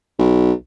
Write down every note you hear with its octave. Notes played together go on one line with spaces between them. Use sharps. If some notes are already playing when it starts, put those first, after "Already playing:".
B1